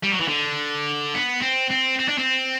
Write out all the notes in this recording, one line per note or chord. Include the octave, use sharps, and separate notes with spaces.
G3
F#3
E3
D3
B3
C4
C4
C4
D4
C4